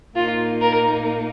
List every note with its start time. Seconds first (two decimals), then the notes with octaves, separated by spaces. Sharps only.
0.16 A#2 A#3 D#4 F4
0.61 A#4